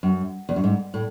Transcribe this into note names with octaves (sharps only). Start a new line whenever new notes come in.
F#2
E2
F#2
G#2
A2